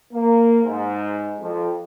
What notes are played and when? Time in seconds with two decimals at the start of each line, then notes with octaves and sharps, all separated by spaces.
0.13 A#3
0.64 G#2
1.41 F2